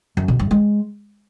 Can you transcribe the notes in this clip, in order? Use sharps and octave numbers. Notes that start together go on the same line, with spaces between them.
F#2
B2
G2
G#3